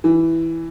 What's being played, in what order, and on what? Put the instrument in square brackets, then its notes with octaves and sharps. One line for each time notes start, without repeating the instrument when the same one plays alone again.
[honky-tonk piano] E3